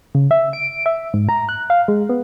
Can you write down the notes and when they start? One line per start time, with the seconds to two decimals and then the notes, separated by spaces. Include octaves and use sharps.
0.15 C#3
0.31 E5
0.53 D7
0.86 E5
1.14 G#2
1.29 A#5
1.49 F#6
1.70 F5
1.88 G#3
2.09 B3